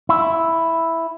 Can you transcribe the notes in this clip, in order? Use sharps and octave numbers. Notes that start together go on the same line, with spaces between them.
E4